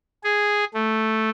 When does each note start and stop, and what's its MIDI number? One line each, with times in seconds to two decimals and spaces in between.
0.24 0.64 68
0.74 1.30 57